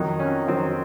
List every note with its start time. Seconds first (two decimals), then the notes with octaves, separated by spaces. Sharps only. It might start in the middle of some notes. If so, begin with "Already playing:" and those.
Already playing: F2 D#3 F#3 D#4
0.20 C#4
0.48 F2 D#3 F#3 C4